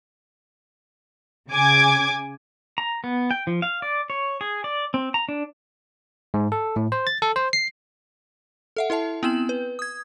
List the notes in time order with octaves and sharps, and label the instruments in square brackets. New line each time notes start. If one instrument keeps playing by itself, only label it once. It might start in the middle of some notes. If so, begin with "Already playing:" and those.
[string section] C#3 G#5 D6 G#6
[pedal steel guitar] A#5
B3
G5
F3
F5
D5
C#5
G#4
D5
C4
A#5
D4
[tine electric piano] G#2
A4
A2
C5
A6
A4
C5
C7
[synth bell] A4 E5 F#5
E4 A4 E5 A5
B3 C4 E4 G5 E7 F#7
B4
D#6 G#6